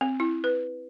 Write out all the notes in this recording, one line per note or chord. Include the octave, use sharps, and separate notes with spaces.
C4
E4
B4